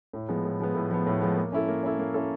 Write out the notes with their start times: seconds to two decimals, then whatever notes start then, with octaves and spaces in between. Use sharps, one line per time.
0.13 A2
0.29 F3 G#3 B3
0.45 A2
0.60 F3 G#3 B3
0.75 A2
0.91 F3 G#3 B3
1.06 A2
1.21 F3 G#3 B3
1.37 A#3
1.52 C#4 E4 A4
1.68 A#3
1.83 C#4 E4 A4
1.99 A#3
2.14 C#4 E4 A4